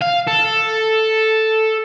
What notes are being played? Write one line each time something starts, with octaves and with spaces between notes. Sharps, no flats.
F5
A4